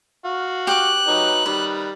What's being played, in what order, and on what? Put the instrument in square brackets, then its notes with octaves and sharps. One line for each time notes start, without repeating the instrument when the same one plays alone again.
[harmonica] F#4 F5
[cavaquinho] G4 D6 [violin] F#6
[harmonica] F#3 D#4 B4
[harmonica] D#3 G3 [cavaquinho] B4